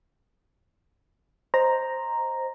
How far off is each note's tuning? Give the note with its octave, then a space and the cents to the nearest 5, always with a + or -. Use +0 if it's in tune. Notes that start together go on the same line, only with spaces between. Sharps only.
C5 +0 D#5 +0 A#5 +0